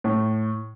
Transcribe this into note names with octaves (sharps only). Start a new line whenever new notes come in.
A2